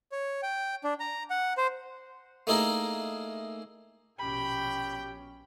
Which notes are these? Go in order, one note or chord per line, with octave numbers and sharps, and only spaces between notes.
C#5
G5
D4
A#5
F#5
C5
A3 A#3 D#4 E4 G#4 A#4
A#1 B2 C#4 G4 G5 B5